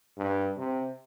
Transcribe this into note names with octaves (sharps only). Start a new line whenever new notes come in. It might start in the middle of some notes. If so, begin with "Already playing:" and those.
G2
C3